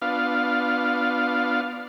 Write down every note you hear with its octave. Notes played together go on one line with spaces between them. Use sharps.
B3 D4 F4 F5